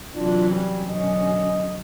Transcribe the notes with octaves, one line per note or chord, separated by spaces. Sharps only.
C3 E3 F#3 D4 F4
G3 C#4
F#2 B2 D3 D#5